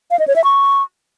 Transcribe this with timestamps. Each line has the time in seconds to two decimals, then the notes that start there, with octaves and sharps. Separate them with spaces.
0.11 F5
0.19 D#5
0.28 C#5
0.36 E5
0.44 C#6